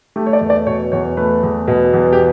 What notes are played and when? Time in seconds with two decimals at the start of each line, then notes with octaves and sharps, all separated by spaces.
0.16 A3 G4
0.27 C#5
0.33 D5
0.41 E2
0.50 D5
0.66 B2 C#5
0.92 E2 C#5
1.17 A3 B4
1.43 E2
1.68 B2
1.93 E2
2.13 G4